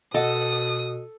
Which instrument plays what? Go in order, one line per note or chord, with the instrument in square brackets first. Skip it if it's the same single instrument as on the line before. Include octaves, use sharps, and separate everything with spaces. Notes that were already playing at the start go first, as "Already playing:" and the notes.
[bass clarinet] B2 [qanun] A4 [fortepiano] D#5 F#5 [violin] D#6